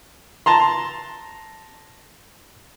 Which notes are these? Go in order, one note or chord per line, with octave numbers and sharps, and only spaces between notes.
A5 A#5 C6